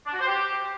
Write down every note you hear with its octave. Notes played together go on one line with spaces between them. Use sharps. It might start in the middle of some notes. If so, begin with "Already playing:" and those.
D4
F#4
C5
G4